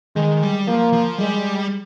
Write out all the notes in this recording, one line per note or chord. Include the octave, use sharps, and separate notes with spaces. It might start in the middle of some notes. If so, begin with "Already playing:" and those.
D#3 G#3
G3
F3 A#3
F3
G3 G#3